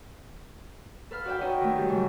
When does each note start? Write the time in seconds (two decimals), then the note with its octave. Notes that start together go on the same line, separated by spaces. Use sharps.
1.11 A4 B4 F5 F6
1.25 F#4 B4 D5 E5 G5
1.41 C#4 D#4 F#4 B4 C#5 D#5
1.61 D#3 A3
1.77 F#3 G3 G4
1.89 G#2 C#3 F#3